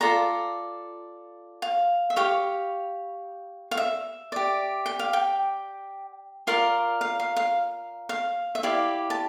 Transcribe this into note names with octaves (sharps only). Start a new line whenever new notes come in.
F4 A4 D5 A#5
F5
E5
G4 C#5 F5
F5
E5
G4 D5
G5
F5
G5
F4 A#4 D5 F5
F5
F5
F5
F5
E5
E4 G4 D5 F5
A5